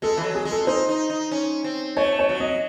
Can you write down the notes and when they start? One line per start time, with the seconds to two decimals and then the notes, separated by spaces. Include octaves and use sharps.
0.02 G#3 A4
0.17 E3
0.23 F#3
0.35 G#4
0.45 G#3
0.51 A4
0.67 D#4 C5
0.89 D#4
1.10 D#4
1.31 C#4
1.64 C4
1.96 A3 C#5
2.19 C#5
2.29 F#3
2.40 D#5